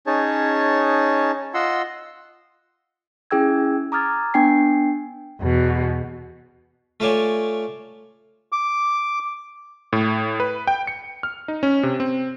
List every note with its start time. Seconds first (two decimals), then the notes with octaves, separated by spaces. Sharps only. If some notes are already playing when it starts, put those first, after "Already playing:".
0.07 C#4 D#4 G#4 C#5 A5
1.54 F4 D#5 F#5 C6 E6
3.31 C#4 E4 G#4 G5 E6 G#6
3.92 A#5 D6 D#6 F6 G#6 A6
4.34 B3 D4 G5 G#5 C7
5.41 E2 B2
7.00 A3 F4 A4 C#5 D5 G#5
8.52 D6
9.93 A2
10.40 B4
10.67 G5
10.87 C#7
11.23 F6
11.48 D#4
11.63 C#4
11.83 C3
12.00 C4